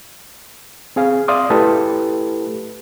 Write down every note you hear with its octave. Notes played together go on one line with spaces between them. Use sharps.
C4 G#4 F5
D5 E5 F5 C6 D#6
A3 E4 G4 A4 B4